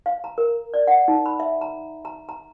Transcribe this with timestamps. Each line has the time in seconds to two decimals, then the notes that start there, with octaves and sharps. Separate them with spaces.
0.06 F5
0.24 A#5
0.38 A#4
0.74 D5
0.87 F#5
1.08 D#4
1.26 B5
1.40 E5
1.61 A#5
2.05 A#5
2.29 A#5